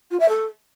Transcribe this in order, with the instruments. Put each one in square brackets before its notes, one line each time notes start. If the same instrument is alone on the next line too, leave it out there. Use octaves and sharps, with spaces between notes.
[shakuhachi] F4
E5
A4